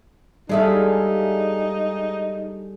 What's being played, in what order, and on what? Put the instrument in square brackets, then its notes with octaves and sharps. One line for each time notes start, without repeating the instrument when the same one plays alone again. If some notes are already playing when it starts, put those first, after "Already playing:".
[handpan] G3 G#4 A4 [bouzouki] G#3 E5 F5 [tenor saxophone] D#4